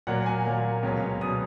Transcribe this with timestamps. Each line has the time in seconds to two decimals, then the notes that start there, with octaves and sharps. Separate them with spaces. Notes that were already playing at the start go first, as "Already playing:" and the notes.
0.07 A#2 F#3 A#3 F#5
0.26 G#5
0.45 A#2 F#3 A#3
0.83 C#2 B2 F#3 C#4
1.21 B2 F#3 C#4 D#6